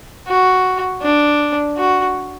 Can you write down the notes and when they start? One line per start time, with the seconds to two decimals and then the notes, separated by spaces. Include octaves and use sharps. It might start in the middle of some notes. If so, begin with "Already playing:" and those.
0.28 F#4
1.02 D4
1.77 F#4